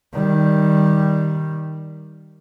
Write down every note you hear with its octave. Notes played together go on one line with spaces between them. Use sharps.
D#3 G3